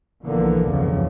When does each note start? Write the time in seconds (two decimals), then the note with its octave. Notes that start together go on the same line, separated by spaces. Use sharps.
0.24 B1 D3 E3 F3 A#3 B3
0.67 F#1 D#2 G#2 C#3 E3 F3